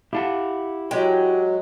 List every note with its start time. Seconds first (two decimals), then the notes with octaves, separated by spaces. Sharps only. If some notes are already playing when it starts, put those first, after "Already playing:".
0.13 E4 G4 F5 F#5 A5
0.91 F#3 G#3 G4 G5